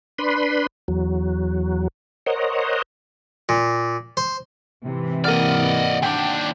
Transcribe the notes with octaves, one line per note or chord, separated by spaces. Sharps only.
D4 B4 B5 C6
E2 F#3
A#4 C5 C#5 D#5 F#5
A#2
C5
G#2 C3 E3
A#3 D5 D#5 F#5 F6
D#2 D4 G5